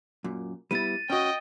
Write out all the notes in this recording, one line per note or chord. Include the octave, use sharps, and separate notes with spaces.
F#2 A#2
G3 B3 E4 A6 D#7
C#4 F#4 D#5 G5